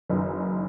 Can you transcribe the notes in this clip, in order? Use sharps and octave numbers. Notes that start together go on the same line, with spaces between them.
F#1 F#2 D#3 B4